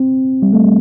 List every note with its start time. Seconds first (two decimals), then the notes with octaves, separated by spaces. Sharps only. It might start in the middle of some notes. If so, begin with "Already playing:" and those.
Already playing: C4
0.42 G3
0.53 A3
0.64 G3